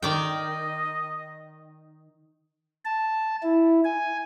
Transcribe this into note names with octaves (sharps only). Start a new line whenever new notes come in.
D#3 D5 D#5 G5
A5
E4
G#5